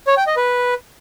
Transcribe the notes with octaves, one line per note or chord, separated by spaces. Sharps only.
C#5
G5
D#5
B4